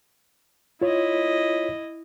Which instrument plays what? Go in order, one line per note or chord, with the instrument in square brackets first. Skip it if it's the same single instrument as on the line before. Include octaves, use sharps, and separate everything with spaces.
[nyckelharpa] E4 D#5 [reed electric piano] F4 C#5